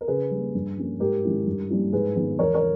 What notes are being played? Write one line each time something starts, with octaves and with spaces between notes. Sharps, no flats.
A#4
C#3 G#4 B4
G3 A#3
G2
G3 A#3 C#4
G#2 G4 A#4
D#3 G#3 C#4 E4
G2
G3 A#3 C#4 E4
G#2 G#4 B4
D#3 G#3 B3
E2 A#4 C#5
A#4 C#5